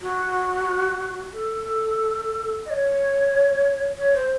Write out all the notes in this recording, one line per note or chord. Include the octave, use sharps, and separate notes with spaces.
F#4
A4
D#5
C#5
C#5
C5